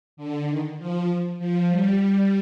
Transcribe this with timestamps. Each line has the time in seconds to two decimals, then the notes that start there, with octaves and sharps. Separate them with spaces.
0.17 D3
0.48 D#3
0.78 F3
1.39 F3
1.70 G3